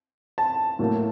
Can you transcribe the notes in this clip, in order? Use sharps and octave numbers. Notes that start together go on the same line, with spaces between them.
A5
A2 F#3 A#3